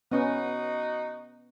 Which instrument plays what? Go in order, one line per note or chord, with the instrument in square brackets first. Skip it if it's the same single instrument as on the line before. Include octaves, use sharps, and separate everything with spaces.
[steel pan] B3 C#4 [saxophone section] D#4 F#4 D#5